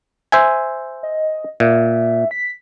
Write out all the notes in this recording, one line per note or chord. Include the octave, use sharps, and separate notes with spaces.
C5 E5 G#5
D#5
A#2 E5
B6